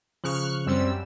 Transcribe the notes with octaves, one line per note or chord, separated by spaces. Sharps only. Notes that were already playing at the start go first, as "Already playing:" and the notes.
C#3 F3 C#6 F6 F#6
F#2 G3 C4 E6